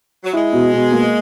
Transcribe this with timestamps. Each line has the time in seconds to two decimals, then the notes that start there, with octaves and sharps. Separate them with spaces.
0.23 F#3
0.33 G#3 E4
0.53 B2
0.73 B2
0.92 A#3